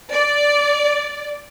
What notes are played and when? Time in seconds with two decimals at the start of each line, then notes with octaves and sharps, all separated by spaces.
0.11 D5